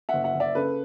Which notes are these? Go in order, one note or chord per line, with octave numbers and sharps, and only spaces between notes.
F#1 E5 F#5
E5 F#5
F#1
D5 E5
C#3 A4 B4